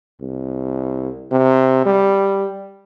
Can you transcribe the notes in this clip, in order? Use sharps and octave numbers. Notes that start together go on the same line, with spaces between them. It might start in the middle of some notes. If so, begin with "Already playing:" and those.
C2
C3
G3